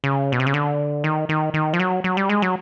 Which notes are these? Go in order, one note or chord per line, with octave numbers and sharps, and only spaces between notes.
C#3
B2
C3
C#3
D3
D#3
D#3
D#3
F3
F#3
F#3
G3
G#3
F#3